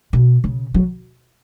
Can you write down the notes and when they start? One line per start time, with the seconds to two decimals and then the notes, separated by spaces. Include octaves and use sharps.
0.13 B2
0.44 C#3
0.74 F#3